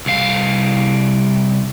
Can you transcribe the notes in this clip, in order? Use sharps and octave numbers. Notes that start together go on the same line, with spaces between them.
C2 F5